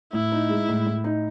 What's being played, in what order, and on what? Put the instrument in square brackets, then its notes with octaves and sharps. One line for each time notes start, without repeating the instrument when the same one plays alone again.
[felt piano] A2 [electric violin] E4
[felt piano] D#4
G#3
A2
A2
D#4